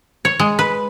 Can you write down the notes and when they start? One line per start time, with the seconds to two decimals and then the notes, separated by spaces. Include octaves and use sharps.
0.25 C#5
0.40 G#3
0.59 B4